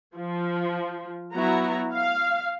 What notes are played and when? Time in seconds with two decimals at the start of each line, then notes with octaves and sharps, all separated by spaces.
0.15 F3
1.34 F#3 B3 E4 F#4 A#5
1.94 F5